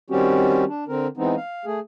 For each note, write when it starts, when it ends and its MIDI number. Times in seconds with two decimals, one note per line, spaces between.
0.10 0.64 51
0.10 0.64 55
0.10 0.64 60
0.10 0.64 61
0.10 0.64 66
0.10 0.64 67
0.68 0.84 62
0.88 1.07 50
0.88 1.07 60
0.88 1.07 70
1.17 1.35 52
1.17 1.35 56
1.17 1.35 59
1.17 1.35 60
1.17 1.35 63
1.37 1.65 77
1.65 1.80 57
1.65 1.80 68